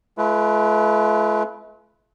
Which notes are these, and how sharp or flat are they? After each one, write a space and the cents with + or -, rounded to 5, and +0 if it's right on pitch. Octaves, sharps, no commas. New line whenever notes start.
A3 -45 F4 -45 B4 +0